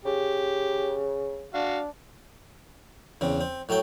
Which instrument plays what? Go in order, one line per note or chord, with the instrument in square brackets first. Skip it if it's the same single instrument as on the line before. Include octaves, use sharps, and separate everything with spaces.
[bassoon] C#3 [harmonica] G4
[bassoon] D4 [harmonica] F#4 F5
[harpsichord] E2 C#3 C4
C4
A2 F#3 A3 G5